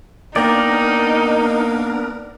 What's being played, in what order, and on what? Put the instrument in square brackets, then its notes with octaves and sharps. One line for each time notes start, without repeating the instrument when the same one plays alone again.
[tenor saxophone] A#3 [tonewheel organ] B3 D4 A#4 [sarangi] D#4 [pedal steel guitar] D5 G5 A#5